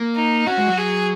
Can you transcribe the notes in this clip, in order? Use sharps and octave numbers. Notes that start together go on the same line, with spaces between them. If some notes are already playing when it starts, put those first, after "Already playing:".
Already playing: A#3
D#4
C#4 F#4
G#3
F#3
G#4